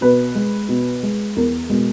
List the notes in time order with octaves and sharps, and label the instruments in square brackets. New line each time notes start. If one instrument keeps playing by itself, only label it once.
[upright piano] B2 B4
G#3
B2
G#3
E2 A#4
B2 G#3